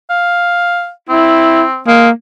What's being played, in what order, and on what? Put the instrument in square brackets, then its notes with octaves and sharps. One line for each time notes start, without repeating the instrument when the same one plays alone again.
[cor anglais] F5
[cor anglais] C4 [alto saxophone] E4
[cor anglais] G#3 [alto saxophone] A#3